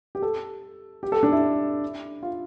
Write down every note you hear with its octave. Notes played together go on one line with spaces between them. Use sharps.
G4
A4
G4
A4
D4
E4
F4